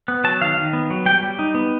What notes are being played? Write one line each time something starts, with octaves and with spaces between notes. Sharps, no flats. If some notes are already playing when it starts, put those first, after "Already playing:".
B3
F#3 A5
D#3 F5
D#3
B3
F#3
G3 G5
G3
D#4
B3